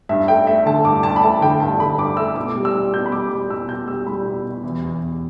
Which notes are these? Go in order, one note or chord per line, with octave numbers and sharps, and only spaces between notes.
G2 E5
A3 G5
A3 E5
D3 A5
G2 D6
G2 A5
B5
A3 A5
D3 G5
G2 A5
D3 B5
G2 D6
A3 E6
B2 D6
G3
E6
G3
B2 G6
B5
G3 D6
G3 D6
B2 E6
B2 G6
G3 E6
G3 B5
B2
B2
E2
E2
E2